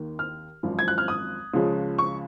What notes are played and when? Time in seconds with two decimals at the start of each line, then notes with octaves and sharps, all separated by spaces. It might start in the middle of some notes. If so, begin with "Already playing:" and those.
Already playing: D#2 D#3 A#3
0.19 F6
0.63 G#1 F#2 F3
0.79 G#6
0.88 F#6
0.98 F6
1.08 D#6
1.54 C#2 C#3 F3 G#3 C#4
1.98 C#6